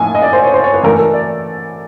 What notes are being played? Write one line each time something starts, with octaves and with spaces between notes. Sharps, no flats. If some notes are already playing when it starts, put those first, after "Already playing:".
Already playing: A2 F3 A#3 D#4 G#5
D#5
D5
C5
C#5
C5
C#5
B4
E3 A3 D4 A#4
A4
D5